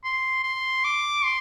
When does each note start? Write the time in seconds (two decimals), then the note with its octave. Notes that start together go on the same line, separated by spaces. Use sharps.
0.04 C6
0.43 C6
0.84 D6
1.24 C6